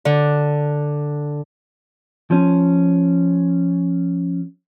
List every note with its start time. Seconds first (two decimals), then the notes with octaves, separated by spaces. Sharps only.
0.05 D3
2.31 F3 C#4